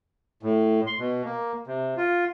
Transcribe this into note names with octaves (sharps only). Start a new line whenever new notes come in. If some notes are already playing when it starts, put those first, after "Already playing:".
A2
C6
B2
A#3
C3
F4